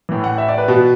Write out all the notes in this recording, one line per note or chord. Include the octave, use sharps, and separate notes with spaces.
A2 E3
F#5
E5
D5
B4
B2